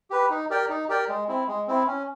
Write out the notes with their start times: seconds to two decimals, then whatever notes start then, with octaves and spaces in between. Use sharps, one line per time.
0.10 G4 B4
0.30 D#4
0.50 G4 A#4 D5 G5
0.69 D#4
0.89 G4 A#4 D5 G5
1.09 G#3
1.28 C4 E4
1.48 G#3
1.68 C4 E4
1.87 C#4